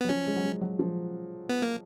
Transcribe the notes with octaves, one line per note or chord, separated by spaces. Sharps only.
B3
F#3
F3 C#4
G#3
F#3
G#3
F#3
F3
B3
A#3